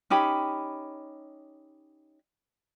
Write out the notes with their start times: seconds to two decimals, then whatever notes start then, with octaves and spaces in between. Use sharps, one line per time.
0.10 C#4 D#4 G4 B5